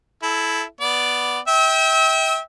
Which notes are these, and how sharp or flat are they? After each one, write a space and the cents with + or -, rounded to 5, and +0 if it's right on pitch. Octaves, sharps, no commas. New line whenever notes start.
E4 +0 A4 -25
B3 +0 D5 +0
E5 -40 G5 +0 E6 -35